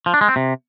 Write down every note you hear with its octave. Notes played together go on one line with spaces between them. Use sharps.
F3
D4
G#3
C4
C3